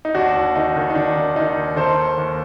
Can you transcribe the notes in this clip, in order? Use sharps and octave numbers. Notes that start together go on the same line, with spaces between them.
D#4
D#2 D4 F#4
D#2
D#3 D#4
D#3
D#4
D#3 D4
D#3
D#3 D#4
D#2
D#3 A4 C5
D#2
D#2